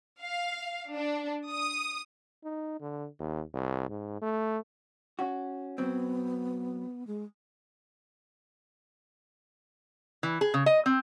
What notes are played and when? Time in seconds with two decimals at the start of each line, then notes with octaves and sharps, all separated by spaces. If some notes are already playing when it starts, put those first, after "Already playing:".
0.21 F5
0.94 D4
1.50 D#6
2.44 D#4
2.81 D3
3.19 D#2
3.54 C2
3.89 G#2
4.22 A3
5.19 C#4 F#4
5.78 F#3 B3 C4
7.07 G#3
10.23 E3
10.41 G#4
10.54 C#3
10.66 D#5
10.86 C4